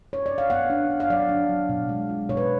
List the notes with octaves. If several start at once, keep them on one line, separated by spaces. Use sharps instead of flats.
C#5
D5
F5
B3 F#5
D4
D4
F5
F#3 D5
D4
F#3
B2
G#3
F4
B2 C#5
B4